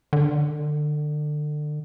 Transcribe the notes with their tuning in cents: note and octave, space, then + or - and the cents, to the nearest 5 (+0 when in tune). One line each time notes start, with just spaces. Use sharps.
D3 +30